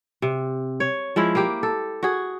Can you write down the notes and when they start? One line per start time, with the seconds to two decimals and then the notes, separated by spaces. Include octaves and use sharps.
0.22 C3
0.80 C#5
1.16 F3 G#3 E4 E5
1.35 A#3 G4
1.63 A4
2.03 F#4 G#4